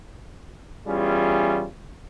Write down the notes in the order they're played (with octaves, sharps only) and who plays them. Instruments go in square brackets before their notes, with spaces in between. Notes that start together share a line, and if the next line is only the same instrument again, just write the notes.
[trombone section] E2 E3 G3 C#4 F4 G#4